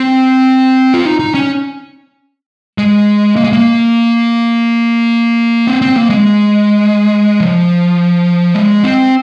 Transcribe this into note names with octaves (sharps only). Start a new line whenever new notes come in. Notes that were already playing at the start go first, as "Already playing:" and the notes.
Already playing: C4
F4
D#4
D#4
C#4
G#3
A#3
G#3
A#3
C4
C4
A#3
G#3
F3
G#3
C4